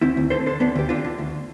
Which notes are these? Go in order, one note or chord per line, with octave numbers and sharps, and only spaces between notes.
D2 C4 E4
D2
D3 A4 C5
D3 A4 C5
D2 B3 D4
D2 G4
D3 D4 F4
D3
D2